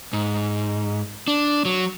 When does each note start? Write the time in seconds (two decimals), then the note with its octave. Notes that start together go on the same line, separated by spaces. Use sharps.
0.13 G#2
1.28 D4
1.65 F#3